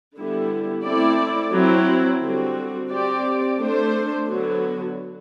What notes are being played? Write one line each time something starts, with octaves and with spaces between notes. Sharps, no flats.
D3 G3 B3 E4
A3 C4 E4 A4 D5
F#3 C4 E4
D3 G3 C4 F#4
C4 G4 D5
A3 D4 A4 C5
D3 F#3 B3 F#4